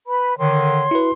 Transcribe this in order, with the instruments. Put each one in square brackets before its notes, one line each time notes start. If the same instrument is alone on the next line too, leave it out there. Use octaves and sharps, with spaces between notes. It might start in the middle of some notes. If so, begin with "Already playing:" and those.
[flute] B4 [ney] B5
[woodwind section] D3 D#3 [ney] C#5 [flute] C6
[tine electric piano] E4 F#4 B4